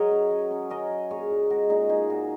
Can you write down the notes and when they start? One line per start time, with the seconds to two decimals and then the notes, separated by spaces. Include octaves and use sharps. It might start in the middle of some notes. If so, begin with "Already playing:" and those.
Already playing: F#3 G#4 A#4 C#5 D#5
0.11 C#4
0.31 F#3
0.51 C#4
0.70 C#4 A#4 D#5
0.90 F#3
1.10 A#2 G#4 C#5
1.30 A#2
1.50 G#3 F#4 A#4
1.69 A#2 D#4 G#4
1.89 A#3 D#4 G#4
2.10 A#2 F#4